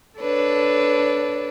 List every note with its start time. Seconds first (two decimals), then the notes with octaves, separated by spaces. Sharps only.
0.19 D4 A4 B4 C#5